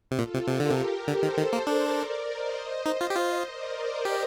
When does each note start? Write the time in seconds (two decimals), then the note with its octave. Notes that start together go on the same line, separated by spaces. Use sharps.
0.11 C3
0.18 A#2 F4 A4
0.33 C3
0.48 C3 G4 A#4
0.60 D3
0.71 C3
1.07 D3 A4 C5
1.23 D#3
1.38 D#3
1.53 A#3
1.67 D4 A#4 D5
2.26 C5 D#5
2.86 D#4
3.01 F4
3.10 G4
3.15 F4 C5 D#5
3.45 A#4 D5
4.05 G4